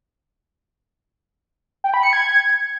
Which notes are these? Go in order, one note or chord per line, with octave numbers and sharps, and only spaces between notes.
G5
B5
C#7
G#6